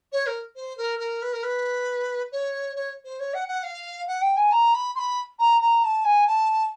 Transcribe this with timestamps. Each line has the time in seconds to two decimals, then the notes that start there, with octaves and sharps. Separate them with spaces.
0.12 C#5
0.26 A#4
0.55 C5
0.77 A#4
0.99 A#4
1.21 B4
1.32 A#4
1.42 B4
2.31 C#5
2.75 C#5
3.04 C5
3.19 C#5
3.33 F#5
3.47 F#5
3.63 F5
4.07 F#5
4.21 G5
4.36 G#5
4.51 A#5
4.73 B5
4.94 C6
4.98 B5
5.39 A#5
5.61 A#5
5.83 A5
6.04 G#5
6.27 A5